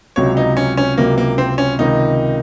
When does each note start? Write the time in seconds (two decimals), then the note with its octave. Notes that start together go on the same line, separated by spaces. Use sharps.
0.16 C#2 C3 F#3 C#5
0.37 D#4
0.57 C#4
0.77 C#4
0.98 C#2 C3 F#3 A#3
1.18 A#3
1.38 C4
1.58 C#4
1.79 C#2 C3 D#3 D#4